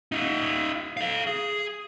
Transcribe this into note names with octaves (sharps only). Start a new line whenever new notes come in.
D#4 F4
A4 F5
G#4